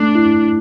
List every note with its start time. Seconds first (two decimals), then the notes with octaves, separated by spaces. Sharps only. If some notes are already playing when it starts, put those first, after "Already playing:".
Already playing: A3 D4
0.15 E4